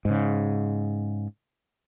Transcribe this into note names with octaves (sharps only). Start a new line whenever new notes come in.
G#2 C#3